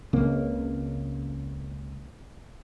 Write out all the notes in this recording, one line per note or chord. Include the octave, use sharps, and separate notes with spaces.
C#2 C#3 A#3 C4